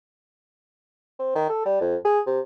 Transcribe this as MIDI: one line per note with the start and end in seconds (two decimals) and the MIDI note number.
1.19 1.32 60
1.35 1.49 51
1.50 1.64 69
1.65 1.77 55
1.81 1.96 41
2.05 2.20 68
2.26 2.40 48